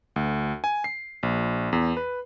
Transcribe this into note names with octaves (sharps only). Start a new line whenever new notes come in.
D2
G#5
C7
A#1
E2
B4